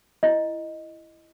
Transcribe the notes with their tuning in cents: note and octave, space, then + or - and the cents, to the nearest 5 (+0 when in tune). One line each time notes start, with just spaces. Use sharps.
E4 +15 D#5 +0